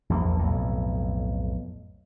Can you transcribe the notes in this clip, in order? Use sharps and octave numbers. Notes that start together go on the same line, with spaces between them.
A#1 E2 A#3
B1 F2 A2